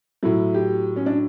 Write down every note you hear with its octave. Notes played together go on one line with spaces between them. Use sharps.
A2 F#3 E4
G4
C#4
D4